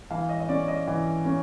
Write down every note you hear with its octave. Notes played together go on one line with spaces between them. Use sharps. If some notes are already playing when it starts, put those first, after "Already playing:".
E3 F5
D#5
D#5
C#4 D5
D#5
E3
C#4